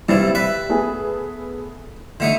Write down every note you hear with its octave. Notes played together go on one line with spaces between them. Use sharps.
G2 C3 G3 E4 E6 A6
B4 E5
A3 B3 G#4
D3 A3 D#4 E5